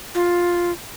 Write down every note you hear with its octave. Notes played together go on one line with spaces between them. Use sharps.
F4